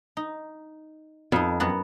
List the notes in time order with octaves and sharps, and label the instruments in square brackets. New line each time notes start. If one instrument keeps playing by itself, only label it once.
[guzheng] D#4
[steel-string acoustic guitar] F2 [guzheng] B3 D#4
[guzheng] F#2 B3 F#4